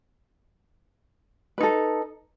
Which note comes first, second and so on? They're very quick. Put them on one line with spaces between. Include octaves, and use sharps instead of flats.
B4 D#4 A4